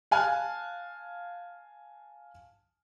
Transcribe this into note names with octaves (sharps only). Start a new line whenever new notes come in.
F5 G#5 A5 F6 F#6